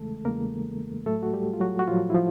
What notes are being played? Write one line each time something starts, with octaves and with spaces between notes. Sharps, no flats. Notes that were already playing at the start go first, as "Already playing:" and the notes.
Already playing: E2 C#3 E3 G#3 A3 A4
E2 C#3 E3 G#3 A#3 A#4
A2 F#3 A3 A4
F#4
G3 G4
F4
F#3 F#4
F#4
A2 F3 F#3 F4
E4
F3 F4